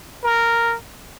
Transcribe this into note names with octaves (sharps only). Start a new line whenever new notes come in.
A#4